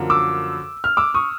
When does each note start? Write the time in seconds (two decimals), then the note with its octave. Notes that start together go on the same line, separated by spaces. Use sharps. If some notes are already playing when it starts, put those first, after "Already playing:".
Already playing: F#2 D3 F3 A#3
0.10 D6 E6
0.84 F6
0.97 D6 E6
1.14 C#6 D#6